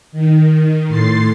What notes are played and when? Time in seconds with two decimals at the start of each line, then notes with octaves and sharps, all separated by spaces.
0.12 D#3
0.88 A2 C6 A6 C7